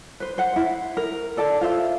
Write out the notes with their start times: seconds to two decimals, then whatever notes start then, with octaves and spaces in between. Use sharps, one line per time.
0.20 B4 C5
0.38 C5 F#5
0.56 E4
0.97 A#4
1.37 A4 D5 A5
1.61 F4 C5 E5